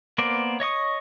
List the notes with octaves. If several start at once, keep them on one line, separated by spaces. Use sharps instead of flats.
A#3 B3 A#4 C5 D5
C#5 D#5 C#6 D#6